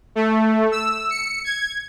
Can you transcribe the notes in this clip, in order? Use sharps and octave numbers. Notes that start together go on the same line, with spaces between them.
A3
E6
C#7
G#6